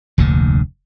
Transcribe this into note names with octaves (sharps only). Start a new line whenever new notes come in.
F1 D2 A#2 D3